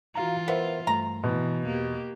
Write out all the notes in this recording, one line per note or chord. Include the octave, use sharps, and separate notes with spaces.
E3 F4 F#4 F5 A#5
B3 A#4 C5 E5
G2 A3 A#5
B2 E3
E2 A#3 G4